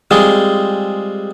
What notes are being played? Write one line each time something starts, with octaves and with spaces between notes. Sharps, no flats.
G3 G#3 C4 F4 G#4